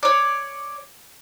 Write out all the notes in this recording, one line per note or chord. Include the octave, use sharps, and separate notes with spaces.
C#5 D5